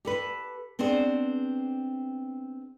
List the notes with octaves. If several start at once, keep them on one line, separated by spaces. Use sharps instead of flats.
G4 A4 B4
B3 C4 D4 G#4 C5